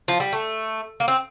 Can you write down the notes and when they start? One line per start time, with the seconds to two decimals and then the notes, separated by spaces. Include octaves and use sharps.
0.08 F3
0.20 G3
0.33 A3
1.00 A#3
1.08 C4